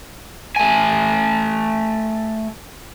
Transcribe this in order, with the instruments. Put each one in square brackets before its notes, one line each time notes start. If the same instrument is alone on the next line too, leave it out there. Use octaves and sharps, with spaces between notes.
[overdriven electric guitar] A3 G#5